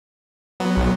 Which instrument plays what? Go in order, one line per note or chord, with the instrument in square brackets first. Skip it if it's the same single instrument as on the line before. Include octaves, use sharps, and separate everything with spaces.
[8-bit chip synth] F#3 B3
[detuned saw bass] B1